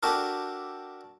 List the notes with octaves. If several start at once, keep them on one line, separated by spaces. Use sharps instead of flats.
D4 F#4 G4 A4 A#4